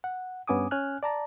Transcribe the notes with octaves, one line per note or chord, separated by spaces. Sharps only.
F#5
G2 B3 C#4 G#5 D6 D#6
C#4 G#5 F6 F#6
D5 A5 A#5